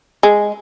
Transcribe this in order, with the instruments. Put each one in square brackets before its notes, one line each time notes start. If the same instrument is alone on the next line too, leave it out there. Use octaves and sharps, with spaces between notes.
[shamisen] G#3